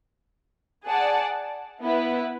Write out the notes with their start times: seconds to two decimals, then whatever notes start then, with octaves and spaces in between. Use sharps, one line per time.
0.84 G#4 D5 F#5 A5
1.83 B3 E4 B4